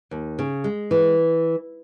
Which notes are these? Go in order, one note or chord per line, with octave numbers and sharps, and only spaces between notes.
D#2
C#3
G#3
E3